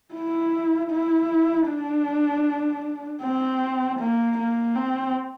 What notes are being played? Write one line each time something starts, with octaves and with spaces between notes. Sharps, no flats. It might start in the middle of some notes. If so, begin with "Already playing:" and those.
E4
E4
D4
C4
A#3
A#3
C4